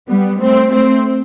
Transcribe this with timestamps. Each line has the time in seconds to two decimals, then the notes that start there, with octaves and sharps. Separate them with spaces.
0.09 G3 B3
0.40 A3 C4
0.72 A3 C4